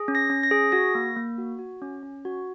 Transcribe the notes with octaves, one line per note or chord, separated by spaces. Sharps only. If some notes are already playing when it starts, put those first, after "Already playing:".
Already playing: G#4
C#4
A#6
C#4
A#6
G#4
F#4 A#6
A#3
A#3
F#4
F#4
C#4
C#4
F#4